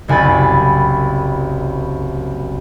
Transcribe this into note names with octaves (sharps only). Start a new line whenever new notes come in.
F#1 C2 G#5 B5 A6